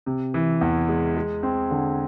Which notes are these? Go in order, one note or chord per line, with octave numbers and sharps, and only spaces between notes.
C3
E3
E2
G#3
G#3
C4
D3